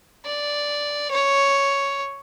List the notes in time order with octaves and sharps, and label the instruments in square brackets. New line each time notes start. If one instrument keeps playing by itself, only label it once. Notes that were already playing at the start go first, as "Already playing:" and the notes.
[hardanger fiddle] D5
C#5